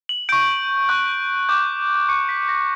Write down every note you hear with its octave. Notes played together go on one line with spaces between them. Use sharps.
F#7
C#6 G6 D7
C#6 F#6
D6 G6
C#6 F#6 C#7
B6
A#6